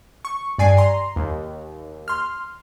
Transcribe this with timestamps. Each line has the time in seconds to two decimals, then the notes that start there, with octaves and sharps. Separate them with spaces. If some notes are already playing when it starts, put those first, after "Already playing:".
0.25 C#6
0.59 G2 D5 G#5 C7
0.77 A#5 C6
1.16 D#2
2.08 C6 F6